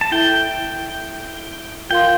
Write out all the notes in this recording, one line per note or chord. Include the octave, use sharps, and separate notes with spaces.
A5
E4 A4 E5 G5
F4 A#4 F5 G5 C6